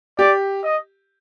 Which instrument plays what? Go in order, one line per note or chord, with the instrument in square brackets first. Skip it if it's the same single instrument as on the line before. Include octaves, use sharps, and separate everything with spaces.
[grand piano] G4 [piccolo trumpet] D5
[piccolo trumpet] D#5